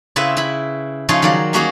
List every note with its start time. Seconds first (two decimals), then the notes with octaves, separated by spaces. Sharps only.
0.16 C#3 C4 E4 B4 E5
0.37 E4 B5
1.09 C#3 F3 C#4 D#4 F4 G#4
1.22 D#3 F#3 D5
1.53 G3 A#3 C#4 F#4 G#4